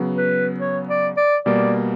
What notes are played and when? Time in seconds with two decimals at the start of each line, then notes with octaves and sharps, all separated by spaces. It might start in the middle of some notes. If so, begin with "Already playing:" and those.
Already playing: C#3 F#3 B3
0.18 B4
0.60 C#5
0.89 D5
1.17 D5
1.45 B2 G3 A#3 D5